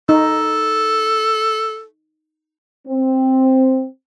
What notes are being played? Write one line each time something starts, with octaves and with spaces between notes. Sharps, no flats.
D#4 A4
C4